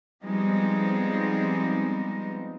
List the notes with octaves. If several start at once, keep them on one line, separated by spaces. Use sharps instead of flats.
F3 G3 G#3 B3 C4 D#4